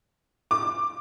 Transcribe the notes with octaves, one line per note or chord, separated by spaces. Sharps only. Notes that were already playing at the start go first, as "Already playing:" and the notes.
D6